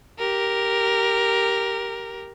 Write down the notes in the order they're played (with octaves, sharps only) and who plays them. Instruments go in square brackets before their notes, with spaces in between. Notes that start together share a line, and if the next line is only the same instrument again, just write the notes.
[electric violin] G4 A#4